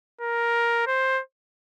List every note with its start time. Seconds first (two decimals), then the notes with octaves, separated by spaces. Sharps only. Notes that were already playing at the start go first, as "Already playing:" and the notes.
0.22 A#4
0.87 C5